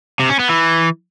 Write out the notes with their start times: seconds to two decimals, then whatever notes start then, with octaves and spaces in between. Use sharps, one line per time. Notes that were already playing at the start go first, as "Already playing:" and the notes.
0.20 C3
0.29 C#4
0.39 B3
0.49 E3